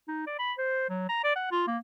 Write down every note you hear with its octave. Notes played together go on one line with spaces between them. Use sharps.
D#4
D5
B5
C5
F#3
A#5
D5
F#5
F4
A#3